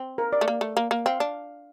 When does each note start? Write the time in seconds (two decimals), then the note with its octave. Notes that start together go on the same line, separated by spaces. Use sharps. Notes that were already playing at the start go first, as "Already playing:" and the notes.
Already playing: C4
0.18 A#4
0.33 D5
0.41 A3
0.48 A#3
0.61 A3
0.77 A#3
0.91 A#3
1.06 C4 F5
1.20 D4